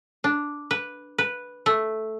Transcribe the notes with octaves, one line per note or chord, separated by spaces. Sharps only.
D4
B4
B4
A3